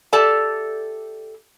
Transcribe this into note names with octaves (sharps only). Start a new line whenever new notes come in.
G4 A4 D5 E5 A5